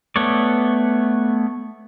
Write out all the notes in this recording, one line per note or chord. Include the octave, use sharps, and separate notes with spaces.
A3 B3 C#5 D5